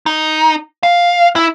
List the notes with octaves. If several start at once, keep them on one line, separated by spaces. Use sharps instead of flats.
D#4
F5
E4